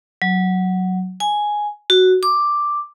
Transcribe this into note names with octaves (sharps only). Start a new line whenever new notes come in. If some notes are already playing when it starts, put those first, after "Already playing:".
F#3
G#5
F#4
D6